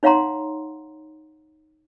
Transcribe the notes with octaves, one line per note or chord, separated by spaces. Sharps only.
D#4 C#5 F5 F#5 A#5 C6